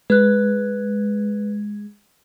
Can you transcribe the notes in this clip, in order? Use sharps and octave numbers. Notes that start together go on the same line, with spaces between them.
G#3 B4 F#6